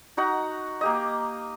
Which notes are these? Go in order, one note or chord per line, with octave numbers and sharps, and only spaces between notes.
D#4 F#4 F#5 A#5
A#3 G4 D#5